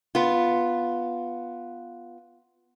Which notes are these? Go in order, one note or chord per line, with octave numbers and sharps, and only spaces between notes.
B3 F4